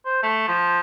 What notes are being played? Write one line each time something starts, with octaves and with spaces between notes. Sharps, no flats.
C5
A3
F3